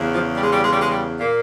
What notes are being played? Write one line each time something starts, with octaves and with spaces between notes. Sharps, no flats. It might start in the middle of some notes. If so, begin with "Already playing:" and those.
Already playing: E2 C#3
F3
G3
G#3
G3
G#3
G3
G#3
G3
A#2 A#3